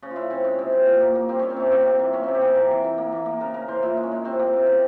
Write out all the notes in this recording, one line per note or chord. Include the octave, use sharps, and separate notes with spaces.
C#3 C#4
F4
C#3 E4
C#3 C4
G#3 C#4
C3
C3
A#2
A#3
A#3
G3 C4
G3 C#4
C4
C3 C#4
A#3 C4
A#3
E3
A#3 C#4
C3 C4
G4
A#3 G#4
E3 A#4
E3
E3
A#3
E3
A#3
C#3 A#4
C#3 A#4
E3 C5
A#2 E4
G#3
C#4
G#3
C3 C4
A#3
C3
C#3